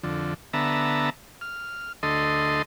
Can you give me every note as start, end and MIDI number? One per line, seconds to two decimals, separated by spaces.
0.04 0.34 41
0.04 0.34 50
0.53 1.10 50
0.53 1.10 59
0.53 1.10 76
0.53 1.10 81
0.53 1.10 82
1.41 1.92 89
2.03 2.62 38
2.03 2.62 69
2.03 2.62 75
2.03 2.62 84